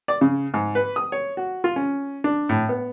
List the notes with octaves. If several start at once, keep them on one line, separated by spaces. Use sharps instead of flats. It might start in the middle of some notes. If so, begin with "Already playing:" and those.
D5
C#3
G#2
B4
D#6
C#5
F#4
F4
C#4
D4
A2
B3